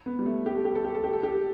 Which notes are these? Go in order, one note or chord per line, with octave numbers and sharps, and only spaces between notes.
B3
G3
A3
G4
A4
G4
A4
G4
A4
G4
A4
G4